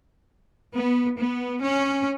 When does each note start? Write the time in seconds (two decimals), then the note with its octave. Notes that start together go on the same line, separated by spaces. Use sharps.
0.75 B3
1.19 B3
1.62 C#4